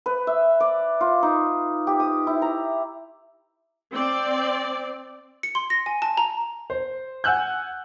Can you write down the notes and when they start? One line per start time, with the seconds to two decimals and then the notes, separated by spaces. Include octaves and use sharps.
0.06 B4
0.27 E5
0.60 D5
1.01 F4
1.23 D#4
1.87 G4
2.00 D#6
2.27 E4
2.42 A#5
3.93 C4 D5
5.43 C#7
5.55 C6
5.70 A#6
5.86 G#5
6.02 A5
6.17 A#5
6.70 C5
7.24 F#5 G#5 E6 F#6 G6